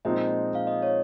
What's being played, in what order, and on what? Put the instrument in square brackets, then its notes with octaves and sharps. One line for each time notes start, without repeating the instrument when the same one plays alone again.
[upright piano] A#2 F3 G#3 C4 D#4 [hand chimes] D#5
[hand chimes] F5
D#5
C#5